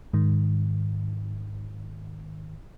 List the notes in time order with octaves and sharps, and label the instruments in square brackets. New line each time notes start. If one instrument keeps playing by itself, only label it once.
[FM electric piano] G#2 D#3